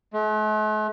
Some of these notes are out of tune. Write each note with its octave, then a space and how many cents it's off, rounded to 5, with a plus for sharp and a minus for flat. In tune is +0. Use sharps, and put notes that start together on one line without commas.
A3 -45